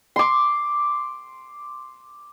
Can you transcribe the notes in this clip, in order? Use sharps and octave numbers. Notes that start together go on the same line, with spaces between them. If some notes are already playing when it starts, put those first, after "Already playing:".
C6 D6